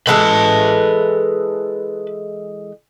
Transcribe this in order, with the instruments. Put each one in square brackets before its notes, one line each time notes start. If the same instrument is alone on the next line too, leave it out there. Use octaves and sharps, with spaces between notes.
[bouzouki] E3 G#3 A4 [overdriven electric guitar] B4 A5